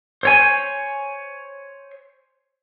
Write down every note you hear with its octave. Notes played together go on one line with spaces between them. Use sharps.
C5 C#5 G#5